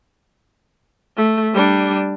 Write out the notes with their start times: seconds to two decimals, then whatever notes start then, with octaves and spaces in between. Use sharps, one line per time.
1.17 A3
1.54 G3 D4